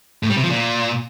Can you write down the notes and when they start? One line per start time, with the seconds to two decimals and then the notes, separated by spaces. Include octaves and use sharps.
0.23 A2
0.30 G3
0.37 C3
0.43 F3
0.50 A#2